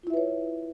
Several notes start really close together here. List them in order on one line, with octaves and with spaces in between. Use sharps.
F4 E4 E5 B4 C#5